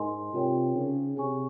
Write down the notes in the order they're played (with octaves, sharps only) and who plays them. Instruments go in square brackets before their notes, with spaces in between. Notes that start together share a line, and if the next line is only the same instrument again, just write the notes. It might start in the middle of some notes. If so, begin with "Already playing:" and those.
Already playing: [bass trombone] G#2 [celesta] D#4 A#4 D#5 G#5 C6
[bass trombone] C3 [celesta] F4 A#4 C#5 G5
[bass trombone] C#3 [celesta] D#4 G#4 C5
[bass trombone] C3 [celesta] G#4 C#5 G#5 C#6